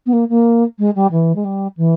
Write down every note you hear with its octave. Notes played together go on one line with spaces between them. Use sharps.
B3
A#3
A#3
G#3
G3
E3
G#3
G3
E3